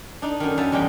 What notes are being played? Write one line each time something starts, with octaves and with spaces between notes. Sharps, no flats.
D4 D#4
F#2 D#3
F#2 E5 G#5 A5
E2 G3 G#3 G4 G5